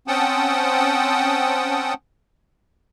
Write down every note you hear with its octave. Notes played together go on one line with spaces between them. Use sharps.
C4 C#4 F#5 G5 A5 D#6